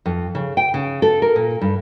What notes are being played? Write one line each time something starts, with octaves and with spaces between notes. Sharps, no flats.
F2
C#3
G5
C#3
A4
A#4
A#2
G2